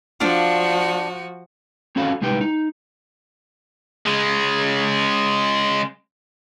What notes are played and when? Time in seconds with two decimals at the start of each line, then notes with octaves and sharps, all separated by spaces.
0.20 F3 D4 F4 F#4
1.96 C4 C#4 F#4 A4 F5 B5
2.22 C2 G#3 D#4 G4 B4 G5
2.41 D#4
4.06 C#3 G#3